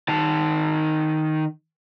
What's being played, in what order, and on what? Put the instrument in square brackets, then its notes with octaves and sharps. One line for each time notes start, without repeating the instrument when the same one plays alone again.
[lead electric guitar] D#3 A5